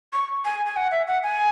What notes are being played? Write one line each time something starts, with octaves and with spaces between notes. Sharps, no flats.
C#6
G#5
G#5
F#5
E5
F#5
G#5